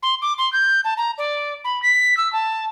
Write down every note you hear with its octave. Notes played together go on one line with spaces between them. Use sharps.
C6
D6
C6
G6
A5
A#5
D5
B5
B6
E6
A5